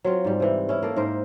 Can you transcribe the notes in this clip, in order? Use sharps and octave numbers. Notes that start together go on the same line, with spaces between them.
F#3 C4 F4
G#2 G3
C3 E3
C#4 E4
A#3 A4
G#2 A#4 C5